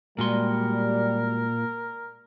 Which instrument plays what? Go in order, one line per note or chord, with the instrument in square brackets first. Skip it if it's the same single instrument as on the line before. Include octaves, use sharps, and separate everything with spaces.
[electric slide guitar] A#2 [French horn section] G3 [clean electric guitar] G#3 F#4 C6 [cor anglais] A#4